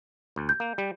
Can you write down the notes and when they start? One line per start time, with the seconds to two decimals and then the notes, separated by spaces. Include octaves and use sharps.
0.36 D2
0.49 G6
0.60 A#3
0.78 G3